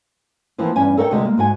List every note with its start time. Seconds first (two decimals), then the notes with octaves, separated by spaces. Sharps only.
0.58 E3 F3 A#3 C4
0.76 E2 G2 C#4 G#5
0.97 A4 A#4 C#5 F#5 G5
1.11 D2 C3 G#3 F#4 D#5
1.25 G#3 A#3
1.38 G#2 F#4 G#5